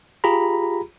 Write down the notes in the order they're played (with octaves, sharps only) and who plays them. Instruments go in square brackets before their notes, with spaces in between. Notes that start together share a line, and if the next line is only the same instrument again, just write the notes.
[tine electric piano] F4 G4 G#4 A#5 B5